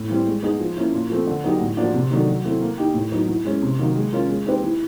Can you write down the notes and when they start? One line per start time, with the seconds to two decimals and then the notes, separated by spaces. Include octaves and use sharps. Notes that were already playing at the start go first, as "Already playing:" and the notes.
Already playing: A2
0.10 E3 G3 C4
0.26 G#3
0.43 B3 D#4 G#4
0.60 F3
0.77 A#3 C#4 E4
0.93 A#2
1.10 F3 A3 C4
1.27 D3
1.44 F#3 B3 D#4 G4
1.61 A2
1.77 F3 A#3 D4 F#4
1.94 C3
2.11 D#3 F#3 A3 D4
2.28 F#3
2.44 A3 C4 E4
2.61 A#3
2.78 D#4 G4
2.94 A2
3.12 F#3 B3 D#4
3.28 E3
3.45 G#3 C#4
3.62 C3
3.79 D#3 F#3 A#3
3.96 G#3
4.12 C#4 F4 A#4
4.29 G#3
4.46 C4 D#4 G4 B4
4.63 E3